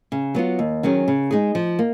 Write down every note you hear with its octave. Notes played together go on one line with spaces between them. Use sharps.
C#3
F#3 B3 F4
D#2
D#3 F#3 C#4 G#4
C#3
G#3 D#4 G#4
F3
A#3